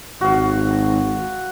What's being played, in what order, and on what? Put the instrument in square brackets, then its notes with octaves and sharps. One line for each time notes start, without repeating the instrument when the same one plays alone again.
[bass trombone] G#1 [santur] F#4 F5